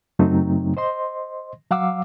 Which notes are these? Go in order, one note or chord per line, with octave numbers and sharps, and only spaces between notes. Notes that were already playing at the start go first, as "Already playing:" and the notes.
F#2 C#3 F#3 A3 C4 D#4
C5 D#5 C6
F#3 F5 F#5 D6 E6